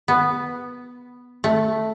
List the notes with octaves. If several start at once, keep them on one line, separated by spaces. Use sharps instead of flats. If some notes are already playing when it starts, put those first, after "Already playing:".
B3
A3